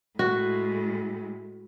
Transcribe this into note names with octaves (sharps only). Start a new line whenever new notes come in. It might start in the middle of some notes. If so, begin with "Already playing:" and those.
A2 G#3 F#4